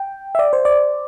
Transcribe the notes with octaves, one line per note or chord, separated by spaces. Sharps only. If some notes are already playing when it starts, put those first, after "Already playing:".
Already playing: G5
E5
D5
C5
D5